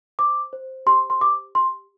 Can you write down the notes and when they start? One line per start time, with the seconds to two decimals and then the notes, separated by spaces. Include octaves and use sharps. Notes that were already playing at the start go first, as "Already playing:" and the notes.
0.19 C5 D6
0.53 C5
0.86 G4 C6
1.10 C6
1.21 G4 D6
1.55 G4 C6